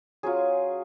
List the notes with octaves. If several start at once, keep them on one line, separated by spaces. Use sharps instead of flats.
F#3 C#4 F4 G#4